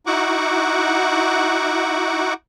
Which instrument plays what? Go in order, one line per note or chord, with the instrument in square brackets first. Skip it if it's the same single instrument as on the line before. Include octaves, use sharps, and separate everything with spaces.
[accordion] D#4 E4 F#4 F#5 C#6 D6